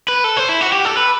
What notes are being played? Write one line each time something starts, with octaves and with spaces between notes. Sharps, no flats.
B4
A4
C5
E4
F#4
G4
A4
B4